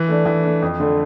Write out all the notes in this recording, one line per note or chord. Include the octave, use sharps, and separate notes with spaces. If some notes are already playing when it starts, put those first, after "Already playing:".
Already playing: E3
A3 D4
E3
A3 D4
F2
D3 A3